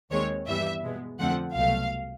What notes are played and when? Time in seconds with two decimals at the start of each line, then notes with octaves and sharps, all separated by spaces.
0.11 D#2 D#3 G#3 C4 C#5
0.47 G2 E3 G3 B3 E5
0.83 B2 G#3 B3
1.19 F2 D3 F3 A3 C4 F#5
1.55 C2 B2 F#3 A3 F5